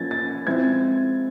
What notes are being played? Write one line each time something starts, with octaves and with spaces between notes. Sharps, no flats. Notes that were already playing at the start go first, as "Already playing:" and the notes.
Already playing: F3 A#3 C#4 G#6 A6
A6
F3 G#3 C4 E4 G#6